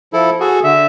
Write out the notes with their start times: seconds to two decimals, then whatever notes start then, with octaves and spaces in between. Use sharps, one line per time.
0.13 F3 E4 A4
0.40 F#4 G#4 A4
0.64 D3 E5